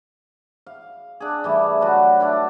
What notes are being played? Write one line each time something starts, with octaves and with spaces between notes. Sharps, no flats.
F5
D4 G#4
E3 G3 A3
F#3 F#4 B4 A5
D4 E4 D5 A5